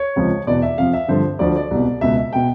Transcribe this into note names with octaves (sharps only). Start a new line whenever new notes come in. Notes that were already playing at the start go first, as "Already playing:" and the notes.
Already playing: C#5
C#2 C3 F3
E2 B2 D5
E5
F2 C3 F3 F5
E5
G2 D3 F3 C5
D2 D3 F3 D5
D5
C2 B2
C#2 B2 E5
E5
B2 G5